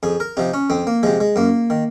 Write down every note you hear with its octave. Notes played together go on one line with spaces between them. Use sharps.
F2 G#4
A#4
C3 F3 D#4
C#4
F2 C4
A#3
C3 F3 G#3
G#3
F#2 A#3
D#3